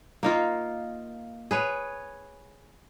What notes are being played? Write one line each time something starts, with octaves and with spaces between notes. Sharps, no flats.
A#3 D#4 F4
G#4 B4 C#5